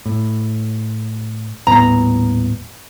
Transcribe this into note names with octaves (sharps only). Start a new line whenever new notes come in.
A2
D#1 A2 B3 A#5